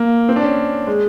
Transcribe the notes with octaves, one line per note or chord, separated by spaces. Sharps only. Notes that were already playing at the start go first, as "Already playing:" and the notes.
Already playing: A#3
C4
D4
C#4
G#3